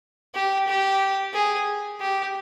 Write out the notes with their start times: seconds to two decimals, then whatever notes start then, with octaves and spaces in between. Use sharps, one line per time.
0.34 G4
0.68 G4
1.33 G#4
2.01 G4